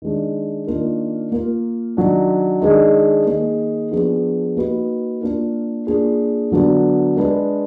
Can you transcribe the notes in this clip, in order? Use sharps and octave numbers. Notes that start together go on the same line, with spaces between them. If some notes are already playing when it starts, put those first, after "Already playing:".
D#3 G#3 D4
D#3 A#3 D4 F4 A#4
A#3 F4 A#4
D#3 F#3 D4
D#3 G#3 D4 G#4
D#3 A#3 D#4 G#4
F3 B3 D4 G#4
A#3 D#4 F#4 B4
A#3 D4 F4 A#4
A#3 D4 F4 G#4
D3 F#3 B3 D4 F#4
G#3 D4 G#4 B4